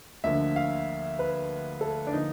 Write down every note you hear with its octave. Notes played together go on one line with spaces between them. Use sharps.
D2 D3 F3 A#3 E5
F5
B4
A4
D4
D3 F3 A#3 D#4